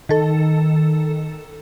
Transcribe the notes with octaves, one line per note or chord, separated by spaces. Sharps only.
D#3 A4